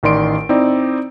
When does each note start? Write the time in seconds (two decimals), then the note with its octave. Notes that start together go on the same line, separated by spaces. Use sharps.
0.03 A1 D#3 D5 C6 D7
0.49 C4 D#4 E4 D5